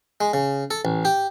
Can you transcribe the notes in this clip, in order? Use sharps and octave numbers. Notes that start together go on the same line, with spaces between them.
G#3
C#3
A4
A1
G4